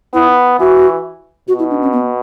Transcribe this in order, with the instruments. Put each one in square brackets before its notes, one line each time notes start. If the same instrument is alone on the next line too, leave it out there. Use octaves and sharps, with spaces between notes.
[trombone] B3 [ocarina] E4
[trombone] E3 [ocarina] F#4
[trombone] B2 [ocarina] F#4
[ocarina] E4
D4
C#4
B3